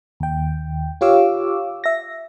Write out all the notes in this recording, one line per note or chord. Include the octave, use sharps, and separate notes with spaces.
D#2 G5
F4 G4 C#5 F5 D6 E6
E5 A#6